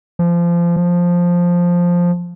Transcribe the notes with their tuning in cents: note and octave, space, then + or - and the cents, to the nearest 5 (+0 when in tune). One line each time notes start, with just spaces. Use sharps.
F3 -25
F3 +5